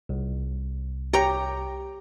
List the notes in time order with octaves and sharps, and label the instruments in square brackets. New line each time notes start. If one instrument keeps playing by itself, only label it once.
[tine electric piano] C2
[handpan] G4 [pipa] C#5 G5 A#5